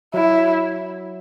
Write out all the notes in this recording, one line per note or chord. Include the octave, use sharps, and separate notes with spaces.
F#3 E4